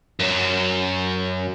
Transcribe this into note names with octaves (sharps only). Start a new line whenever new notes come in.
F#2 F#3